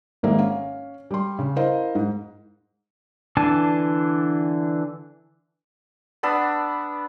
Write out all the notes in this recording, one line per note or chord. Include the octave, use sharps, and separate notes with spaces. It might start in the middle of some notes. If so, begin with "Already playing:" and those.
G#1 G#2 G#3 A#3 E5
C#4 F5
G3 C6
C#3
E4 A#4 C5 D#5 F5
G#2
D3 E3 D4 G#5 A5
B3 D4 B5 E6